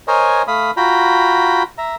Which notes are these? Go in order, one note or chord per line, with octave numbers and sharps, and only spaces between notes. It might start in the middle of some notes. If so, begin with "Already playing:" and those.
A#4 C5 C#5 D#5 G#5
A3 F5 B5 D#6
F4 F#4 G5 A#5 B5
E5 A#5